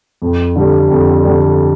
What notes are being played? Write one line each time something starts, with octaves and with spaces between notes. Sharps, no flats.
F2
D3 G3
F2
D3 G3